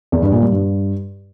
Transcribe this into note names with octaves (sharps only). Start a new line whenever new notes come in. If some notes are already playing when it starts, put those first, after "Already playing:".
E2
G2
A#2
G3
G2